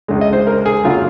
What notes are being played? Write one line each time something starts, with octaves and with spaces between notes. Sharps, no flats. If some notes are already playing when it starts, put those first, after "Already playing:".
C#2 C#3 G#3
D#5
C5
A#4
G#4
F#2 C#3 F#3 A#3 F4